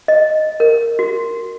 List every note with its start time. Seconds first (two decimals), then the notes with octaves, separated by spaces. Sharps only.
0.08 D#5
0.60 A#4
0.99 F#4